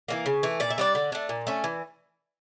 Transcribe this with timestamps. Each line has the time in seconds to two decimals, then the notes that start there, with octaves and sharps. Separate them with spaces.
0.08 E3 G3 A#3
0.26 C#3
0.43 E3 A3
0.60 A#2 D5
0.70 E5
0.78 G3 D4 D5
0.95 D3
1.12 A3 D4
1.29 A#2
1.47 A3 C#4
1.64 E3